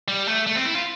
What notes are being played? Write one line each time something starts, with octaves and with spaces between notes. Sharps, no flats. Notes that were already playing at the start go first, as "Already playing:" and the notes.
G3
A3
A3
C4
E4
F4